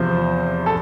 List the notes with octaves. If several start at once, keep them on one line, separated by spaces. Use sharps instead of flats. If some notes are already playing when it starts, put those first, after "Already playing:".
Already playing: E2 C3 F3 C5
A4